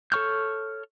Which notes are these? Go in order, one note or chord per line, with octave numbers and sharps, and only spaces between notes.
A4 C#5 C#6 F6 G6